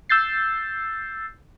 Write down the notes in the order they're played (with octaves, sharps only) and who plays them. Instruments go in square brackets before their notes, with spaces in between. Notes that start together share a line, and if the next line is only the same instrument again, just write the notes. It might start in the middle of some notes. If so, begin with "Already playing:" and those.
[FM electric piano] E6 G6 A6 C7